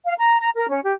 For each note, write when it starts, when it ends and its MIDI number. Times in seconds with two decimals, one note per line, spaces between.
0.06 0.14 77
0.18 0.37 82
0.39 0.50 82
0.56 0.66 70
0.69 0.80 61
0.83 0.92 67